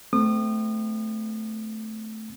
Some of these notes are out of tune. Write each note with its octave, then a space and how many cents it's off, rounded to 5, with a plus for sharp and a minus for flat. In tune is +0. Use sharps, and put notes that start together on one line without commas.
A3 +0 C4 -30 D#6 -35